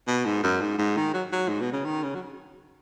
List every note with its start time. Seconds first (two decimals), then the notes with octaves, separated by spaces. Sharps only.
0.08 B2
0.25 G#2
0.43 F#2
0.61 G#2
0.79 G#2
0.97 D#3
1.14 F#3
1.32 F#3
1.48 G#2
1.61 B2
1.73 C#3
1.85 D#3
2.03 C#3
2.15 F#3